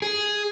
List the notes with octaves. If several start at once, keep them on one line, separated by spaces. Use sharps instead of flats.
G#4